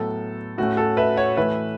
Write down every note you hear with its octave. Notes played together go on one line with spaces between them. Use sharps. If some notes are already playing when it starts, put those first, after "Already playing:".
Already playing: A2 F#3 B3 A4
A2 A3 C#4 F#4
A4
B4 E5
C#5 F#5
A2 E3 A3 B4 E5